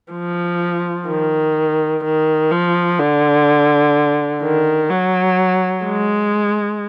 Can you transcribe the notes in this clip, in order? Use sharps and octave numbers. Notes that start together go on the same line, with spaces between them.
F3
D#3
D#3
F3
D3
D#3
F#3
G#3